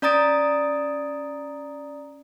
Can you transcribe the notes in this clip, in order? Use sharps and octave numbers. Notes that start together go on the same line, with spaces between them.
C#4 D5 A#5 D#6 A6 D7